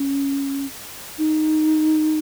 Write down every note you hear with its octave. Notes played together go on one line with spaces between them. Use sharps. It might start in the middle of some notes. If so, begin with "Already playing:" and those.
Already playing: C#4
D#4